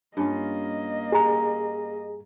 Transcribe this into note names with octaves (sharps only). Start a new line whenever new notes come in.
G2 A#3 C#4 F4 D#5
G4 G#4 A#5